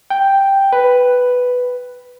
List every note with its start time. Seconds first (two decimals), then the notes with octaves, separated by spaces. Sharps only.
0.10 G5
0.73 B4